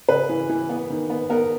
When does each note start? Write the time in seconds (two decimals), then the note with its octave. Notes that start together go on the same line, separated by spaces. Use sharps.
0.09 C#3 B4
0.29 E3
0.49 E3
0.69 B3
0.90 D#3
1.10 B3
1.30 B3 A#4